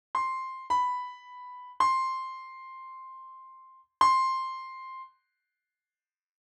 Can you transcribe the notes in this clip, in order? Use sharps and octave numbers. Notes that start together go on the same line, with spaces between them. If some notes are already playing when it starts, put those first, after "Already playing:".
C6
B5
C6
C6